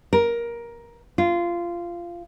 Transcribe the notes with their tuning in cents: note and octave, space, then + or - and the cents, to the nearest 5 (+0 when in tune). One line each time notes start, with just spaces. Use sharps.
A#4 +15
F4 -15